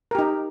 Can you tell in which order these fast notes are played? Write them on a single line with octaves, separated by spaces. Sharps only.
A#4 G4 D#4